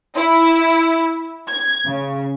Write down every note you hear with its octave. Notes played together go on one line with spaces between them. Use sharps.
E4
G#6
C#3